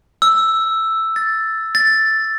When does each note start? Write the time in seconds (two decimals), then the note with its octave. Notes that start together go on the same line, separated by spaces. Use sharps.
0.22 E6
1.16 A6
1.75 A6